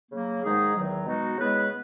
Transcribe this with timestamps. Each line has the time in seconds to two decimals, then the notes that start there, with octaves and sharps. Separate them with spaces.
0.11 C#3 F#3 A#3
0.42 G#2 D#3 G#3 D#4 G#4
0.75 E2 D#3 F#3
1.06 B2 G#3 B3 D#4 F#4
1.38 C#3 G#3 B3 E4 B4